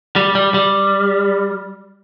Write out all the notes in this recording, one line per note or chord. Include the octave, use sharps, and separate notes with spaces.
G3
G3
G3